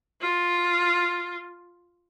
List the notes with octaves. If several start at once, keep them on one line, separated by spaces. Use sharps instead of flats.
F4